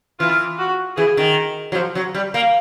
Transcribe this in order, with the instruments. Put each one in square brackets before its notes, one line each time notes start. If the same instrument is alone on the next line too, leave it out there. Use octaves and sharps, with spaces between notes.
[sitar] E3 [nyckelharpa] F4
[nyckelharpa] F#4
[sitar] E3 [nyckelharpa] G#4
[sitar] D#3
F#3
F3
F#3
G3
A#3